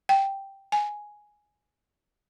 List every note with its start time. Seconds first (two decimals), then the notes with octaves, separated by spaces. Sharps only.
0.09 G5
0.72 G#5